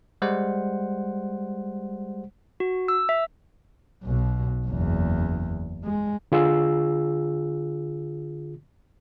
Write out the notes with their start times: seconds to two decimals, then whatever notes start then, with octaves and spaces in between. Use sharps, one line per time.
0.22 G3 G#3 C5 F#5
2.60 F#4
2.88 E6
3.09 E5
4.04 B1 B2
4.67 F#1 E2
5.84 G#3
6.32 D3 F4 G#4 E6